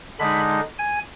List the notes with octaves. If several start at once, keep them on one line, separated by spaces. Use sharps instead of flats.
D3 G#3 D#4 B5
G#5